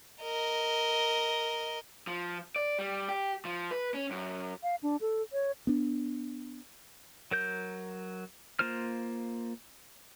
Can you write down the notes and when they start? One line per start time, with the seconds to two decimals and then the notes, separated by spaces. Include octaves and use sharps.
0.22 A#4 D#5
2.07 F3
2.56 D5
2.79 G3
3.09 G4
3.45 F3
3.71 B4
3.94 C#4
4.11 F#2
4.63 F5
4.83 D4
5.01 A4
5.33 C#5
5.67 B3 D4
7.31 F#3 A#4 G6
8.59 A#3 F4 C5 F6